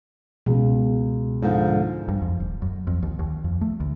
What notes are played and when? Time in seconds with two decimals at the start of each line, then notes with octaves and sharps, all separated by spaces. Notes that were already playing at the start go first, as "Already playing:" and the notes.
0.46 C#2 B2
1.42 G#2 D3 F3
2.09 G2
2.22 F2
2.40 D#1
2.62 F#2
2.87 F2
3.03 D#2
3.19 D#2
3.44 F2
3.61 A3
3.80 D2